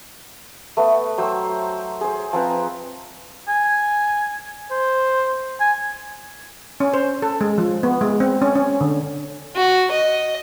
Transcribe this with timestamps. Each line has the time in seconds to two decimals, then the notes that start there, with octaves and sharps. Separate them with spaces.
0.77 A3 B3
1.18 F#3 C5 G5 E6
2.01 G#4 C5
2.33 F3 C4 B4 A#5
3.48 G#5
4.71 C5
5.60 G#5
6.80 C#4
6.94 C5
7.22 A4
7.41 G#3
7.58 F3
7.83 B3
8.01 G#3
8.20 C4
8.42 C#4
8.55 C#4
8.81 D3
9.56 F#4
9.91 D#5